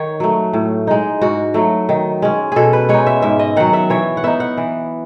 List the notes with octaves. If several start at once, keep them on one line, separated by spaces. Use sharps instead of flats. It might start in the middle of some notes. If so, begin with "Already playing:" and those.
Already playing: D#3 C#5
F#3 A3
A2
G#3 D#4
G#2 F#4
F#3 A3
D#3
G#3 C#4
B2 G#4 A4
B4
G#3 D#4 C#5
E5
G#2 E5
D#5
D#3 F#3 F#5
E5
E3 C#5
F#5
B3 D#4 E5
F#5
E3